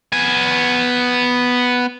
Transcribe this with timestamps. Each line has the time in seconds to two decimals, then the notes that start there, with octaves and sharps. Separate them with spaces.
0.12 B3 G#5